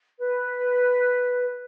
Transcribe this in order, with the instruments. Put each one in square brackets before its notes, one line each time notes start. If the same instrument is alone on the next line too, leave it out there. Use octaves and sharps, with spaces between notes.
[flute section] B4